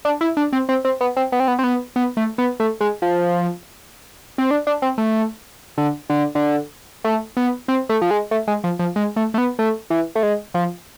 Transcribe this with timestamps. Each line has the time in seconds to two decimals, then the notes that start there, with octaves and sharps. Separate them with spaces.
0.05 D4
0.21 E4
0.37 D4
0.53 C4
0.69 C4
0.85 C4
1.01 B3
1.17 C4
1.32 B3
1.40 C4
1.48 B3
1.59 C4
1.64 B3
1.96 B3
2.17 A3
2.38 B3
2.60 A3
2.81 G#3
3.02 F3
4.38 C4
4.51 D4
4.67 D4
4.82 C4
4.98 A3
5.78 D3
6.10 D3
6.35 D3
7.04 A3
7.37 B3
7.68 C4
7.89 A3
8.02 F3
8.11 G#3
8.31 A3
8.48 G#3
8.64 F3
8.79 F3
8.96 G#3
9.16 A3
9.34 A3
9.38 B3
9.59 A3
9.90 E3
10.15 A3
10.23 G#3
10.54 F3